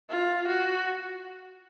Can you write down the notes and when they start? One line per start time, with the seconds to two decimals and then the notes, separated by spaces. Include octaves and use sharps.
0.10 F4
0.48 F#4